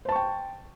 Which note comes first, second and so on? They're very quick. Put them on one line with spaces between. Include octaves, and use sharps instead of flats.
C5 A5 C#6 G5